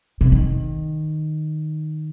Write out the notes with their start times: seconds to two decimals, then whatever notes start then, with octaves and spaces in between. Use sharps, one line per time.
0.21 C3
0.32 D#3